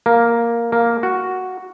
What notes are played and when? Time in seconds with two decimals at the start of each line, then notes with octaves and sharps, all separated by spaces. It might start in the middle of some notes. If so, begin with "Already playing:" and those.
0.06 A#3
0.72 A#3
1.03 F#4